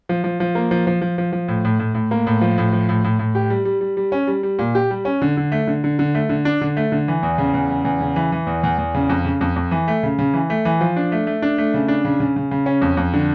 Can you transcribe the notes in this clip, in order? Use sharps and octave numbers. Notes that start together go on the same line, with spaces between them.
F3
F3
F3
A#3
F3
F3
F3
F3
F3
A2
A2
A2
A2
A#3
A2
F3
A2
F3
A2
A2
A2
G4
G3
G3
G3
G3
C#4
G3
G3
A#2
G4
G3
C#4
D3
D3
A3
D3
D3
D3
A3
D3
D4
D3
A3
D3
E3
E2
C#3
E2
C#3
E2
C#3
E3
E3
E2
E2
E2
C#3
F2
C#3
F2
F2
E3
A3
C#3
C#3
E3
A3
E3
F3
D4
A3
A3
D4
A3
C#3
D4
C#3
C#3
C#3
C#3
C#4
F2
F2
D3